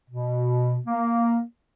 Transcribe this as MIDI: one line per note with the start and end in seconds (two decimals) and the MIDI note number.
0.10 0.77 47
0.86 1.41 58